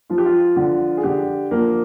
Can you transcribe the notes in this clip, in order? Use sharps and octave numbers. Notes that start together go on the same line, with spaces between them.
F3 F4
G4
F4
D3
G#4
D3 G4
F3 A#3 A#4